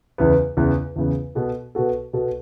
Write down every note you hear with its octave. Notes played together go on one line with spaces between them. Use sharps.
E2 C#3 E3 B3
E2 C#3 E3 B3
E2 C#3 E3 B3
B2 B3 F#4 A4
B2 B3 F#4 A4
B2 B3 F#4 A4